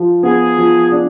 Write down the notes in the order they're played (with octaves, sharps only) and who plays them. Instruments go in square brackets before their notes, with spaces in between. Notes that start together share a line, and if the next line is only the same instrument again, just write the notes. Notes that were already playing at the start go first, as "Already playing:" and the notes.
Already playing: [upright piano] F3
[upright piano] B3 [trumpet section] G#4
[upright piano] F3
D4